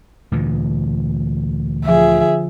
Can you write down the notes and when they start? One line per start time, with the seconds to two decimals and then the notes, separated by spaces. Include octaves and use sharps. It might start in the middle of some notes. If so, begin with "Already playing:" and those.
0.32 D2 A#2 E3
1.85 D3 F3 G#4 E5